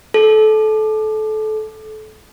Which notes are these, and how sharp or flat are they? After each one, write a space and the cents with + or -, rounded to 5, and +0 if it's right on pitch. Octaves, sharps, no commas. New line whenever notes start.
A4 -25